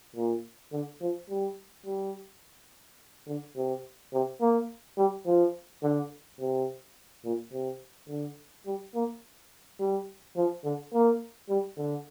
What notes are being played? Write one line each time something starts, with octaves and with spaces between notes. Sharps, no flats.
A#2
D3
F3
G3
G3
D3
C3
C3
A#3
G3
F3
D3
C3
A#2
C3
D3
G3
A#3
G3
F3
D3
A#3
G3
D3